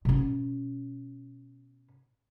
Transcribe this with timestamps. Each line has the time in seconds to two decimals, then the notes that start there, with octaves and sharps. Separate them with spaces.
0.05 B2 C#4